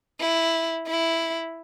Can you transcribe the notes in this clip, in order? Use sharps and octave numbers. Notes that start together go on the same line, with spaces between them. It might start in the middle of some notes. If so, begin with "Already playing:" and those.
E4
E4